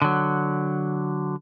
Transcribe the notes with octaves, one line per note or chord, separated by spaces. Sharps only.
D3 F#3